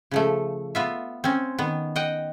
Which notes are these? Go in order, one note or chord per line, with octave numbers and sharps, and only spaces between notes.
C#3 F3 A3
B3 F4 E5
C4 C#4
D#3 B3
D#5 F#5 G5